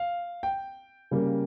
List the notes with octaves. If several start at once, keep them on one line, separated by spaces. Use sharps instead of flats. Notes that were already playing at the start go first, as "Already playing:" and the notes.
Already playing: F5
G5
C#3 G3 A#3